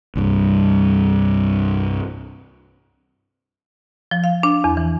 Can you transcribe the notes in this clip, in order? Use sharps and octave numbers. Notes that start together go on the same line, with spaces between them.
C2 G2
F3
F5
D4
E2
E3